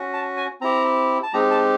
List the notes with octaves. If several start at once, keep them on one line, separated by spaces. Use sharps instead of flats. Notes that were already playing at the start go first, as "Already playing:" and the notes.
Already playing: C#4 F#4
A5
G#5
C4 E4 G4 A#5
A5
G#3 C4 D#4 G4 A#5
A5